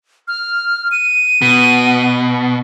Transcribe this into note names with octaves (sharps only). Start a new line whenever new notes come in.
F6
D#7
B2